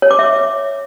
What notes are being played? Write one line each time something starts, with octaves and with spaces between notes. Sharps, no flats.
C#5
D6
E5